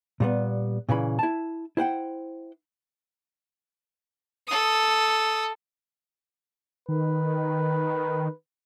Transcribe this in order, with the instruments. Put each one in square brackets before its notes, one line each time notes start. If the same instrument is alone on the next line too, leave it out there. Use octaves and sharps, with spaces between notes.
[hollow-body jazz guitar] A#2 G3 B3
A#2 C#3 E3 B5
E4 A5
E4 C5 F#5 G5
[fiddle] A4 D#6
[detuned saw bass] D#3 [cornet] B4